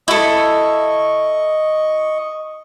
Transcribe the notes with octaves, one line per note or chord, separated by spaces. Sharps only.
E4 A4 D#5 C#6